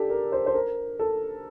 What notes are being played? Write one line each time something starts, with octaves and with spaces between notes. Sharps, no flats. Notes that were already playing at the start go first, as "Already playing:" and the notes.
Already playing: D4 G4 A4
A#4
C5
C5
A#4
A4